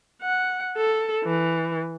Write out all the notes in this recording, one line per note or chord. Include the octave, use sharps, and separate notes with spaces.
F#5
A4
E3